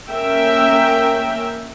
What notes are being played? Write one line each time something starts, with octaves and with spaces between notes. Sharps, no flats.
A#3 C#4 A#4 E5 G5